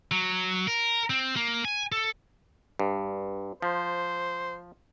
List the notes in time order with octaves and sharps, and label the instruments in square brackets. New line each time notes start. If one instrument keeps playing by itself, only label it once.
[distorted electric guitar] F#3
A#4
C4
A#3
G#5
A4
[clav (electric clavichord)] G2
[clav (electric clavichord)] F3 [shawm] C5